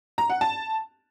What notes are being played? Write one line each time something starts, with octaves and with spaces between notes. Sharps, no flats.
A#5
F#5
A5